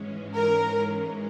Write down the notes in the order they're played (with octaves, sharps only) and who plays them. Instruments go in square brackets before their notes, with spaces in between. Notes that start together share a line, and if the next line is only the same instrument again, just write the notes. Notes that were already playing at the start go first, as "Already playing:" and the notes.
Already playing: [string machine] G#2 E3 G#3 C#4
[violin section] A#4